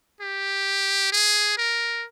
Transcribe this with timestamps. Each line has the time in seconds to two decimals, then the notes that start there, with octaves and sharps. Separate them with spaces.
0.21 G4
1.12 G#4
1.58 A#4